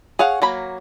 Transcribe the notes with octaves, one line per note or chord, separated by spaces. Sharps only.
G#4 C#5 F5 F#5
F#3 A#3 B5